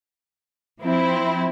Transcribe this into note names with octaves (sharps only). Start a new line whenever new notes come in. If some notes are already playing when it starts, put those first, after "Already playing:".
F3 C4 E4